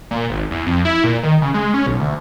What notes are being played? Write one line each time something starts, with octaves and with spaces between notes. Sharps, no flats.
A#2
G#1
E2
F2
E4
A#2
D#3
C#3
G#3
C#4
B1
D2